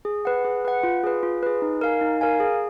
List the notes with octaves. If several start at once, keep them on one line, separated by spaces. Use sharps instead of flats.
G#4
B4 F#5
G#4
B4 F#5
F4
G#4 B4
F4
G#4 B4
D#4
A#4 F5 G#5
D#4
A#4 F5 G#5
G#4